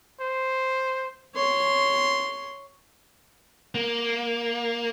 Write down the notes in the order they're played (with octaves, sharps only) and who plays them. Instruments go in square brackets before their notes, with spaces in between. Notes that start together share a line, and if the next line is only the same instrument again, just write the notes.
[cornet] C5
[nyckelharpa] C#5 C6
[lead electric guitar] A#3